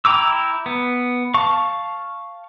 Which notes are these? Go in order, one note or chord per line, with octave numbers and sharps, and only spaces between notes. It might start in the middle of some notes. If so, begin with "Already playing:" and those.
E4 G5 A#5 D6 E6
B3
F5 A5 C#6